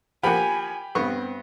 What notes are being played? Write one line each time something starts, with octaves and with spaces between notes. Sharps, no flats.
F3 A#3 G4 F#5 G#5 B5
G2 B3 C4 C#6